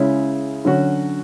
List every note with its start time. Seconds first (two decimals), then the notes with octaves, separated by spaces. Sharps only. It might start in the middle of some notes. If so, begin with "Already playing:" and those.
Already playing: C#3 G#3 C#4 E4
0.65 D3 F#3 C#4 F#4